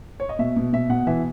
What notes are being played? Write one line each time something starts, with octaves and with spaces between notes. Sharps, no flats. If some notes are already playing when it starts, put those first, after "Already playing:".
C#5
D#5
B2 E5
B2
B2 E5
B2 F#5
E3 E5